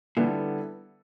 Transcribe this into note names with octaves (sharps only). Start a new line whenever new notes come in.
A#2 D3 G3 B3 E4 A4